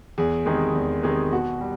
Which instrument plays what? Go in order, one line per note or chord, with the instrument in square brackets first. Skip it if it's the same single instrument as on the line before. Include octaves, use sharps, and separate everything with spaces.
[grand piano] E2 [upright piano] G#4
[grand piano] C3 D#3 G#3
E2
C3 D#3 G#3
[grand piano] B2 [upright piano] F#4
[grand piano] G3